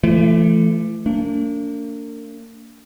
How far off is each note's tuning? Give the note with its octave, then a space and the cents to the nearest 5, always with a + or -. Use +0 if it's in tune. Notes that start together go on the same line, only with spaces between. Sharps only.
E3 +40 A3 +0
A#3 -35 D4 -30